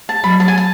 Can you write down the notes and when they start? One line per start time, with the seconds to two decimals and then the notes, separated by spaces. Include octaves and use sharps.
0.09 A5
0.23 F#3 B5
0.40 A5
0.48 G#5
0.57 A5